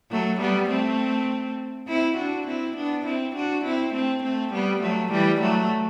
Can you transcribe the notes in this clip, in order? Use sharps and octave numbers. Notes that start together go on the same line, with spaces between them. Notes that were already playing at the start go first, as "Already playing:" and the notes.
F#3 A3
G3 B3
A3 C4
C4 E4
D4 F#4
C4 E4
B3 D4
C4 E4
D4 F#4
C4 E4
A3 C4
A3 C4
G3 B3
F#3 A3
E3 G3
F#3 A3